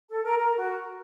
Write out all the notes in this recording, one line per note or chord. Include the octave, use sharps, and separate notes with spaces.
A4
A#4
A#4
F#4